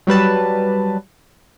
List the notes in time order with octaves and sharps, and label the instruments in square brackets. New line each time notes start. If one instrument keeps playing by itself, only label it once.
[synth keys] F#3 G3 B4 A5